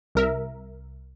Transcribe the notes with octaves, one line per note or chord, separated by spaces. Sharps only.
C2 A#4 E5